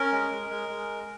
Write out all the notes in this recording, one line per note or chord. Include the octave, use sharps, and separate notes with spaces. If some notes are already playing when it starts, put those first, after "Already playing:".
Already playing: C#4 A#4
G#3
G#3
G#3
G#3